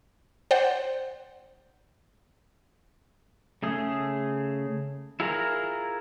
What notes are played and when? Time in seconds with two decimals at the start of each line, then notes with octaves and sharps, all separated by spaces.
0.51 C5 D5 F#5 G5
3.63 C#3 A3 G#4
5.20 E4 F4 G#4 A#4 A#5